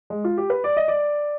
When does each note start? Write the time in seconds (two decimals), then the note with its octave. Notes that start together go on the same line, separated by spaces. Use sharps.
0.10 G#3
0.24 F4
0.38 G4
0.50 B4
0.64 D5
0.77 D#5
0.88 D5